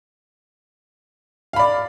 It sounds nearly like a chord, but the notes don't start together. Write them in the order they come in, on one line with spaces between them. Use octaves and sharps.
F5 B5 D5